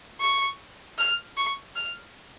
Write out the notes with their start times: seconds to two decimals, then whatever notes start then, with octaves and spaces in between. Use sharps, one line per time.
0.21 C#6
0.98 F6
1.37 C#6
1.76 F6